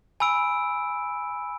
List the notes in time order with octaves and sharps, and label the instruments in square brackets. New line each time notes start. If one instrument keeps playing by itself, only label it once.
[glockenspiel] G#5 B5 E6 D7